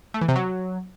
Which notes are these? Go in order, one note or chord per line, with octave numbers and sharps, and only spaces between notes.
A3
E3
C3
F#3